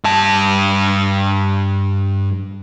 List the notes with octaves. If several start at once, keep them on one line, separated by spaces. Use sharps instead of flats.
G2 A5